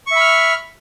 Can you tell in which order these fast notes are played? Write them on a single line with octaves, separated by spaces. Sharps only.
C#6 E5 B5 F6